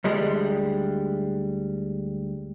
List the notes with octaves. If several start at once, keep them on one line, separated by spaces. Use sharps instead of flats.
D2 G3 G#3